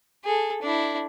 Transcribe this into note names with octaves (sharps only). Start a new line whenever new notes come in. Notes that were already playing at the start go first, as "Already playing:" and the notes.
G#4 A4
D4 E4